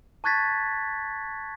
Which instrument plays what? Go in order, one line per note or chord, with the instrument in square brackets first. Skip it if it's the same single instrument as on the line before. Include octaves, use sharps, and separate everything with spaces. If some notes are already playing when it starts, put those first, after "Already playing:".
[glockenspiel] A5 C#6 F#6 G#6 A6 B6